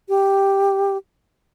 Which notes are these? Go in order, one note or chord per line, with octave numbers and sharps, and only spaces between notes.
G4